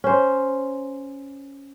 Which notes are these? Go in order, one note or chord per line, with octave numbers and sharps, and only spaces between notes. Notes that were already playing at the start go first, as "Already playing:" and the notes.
C#4 C5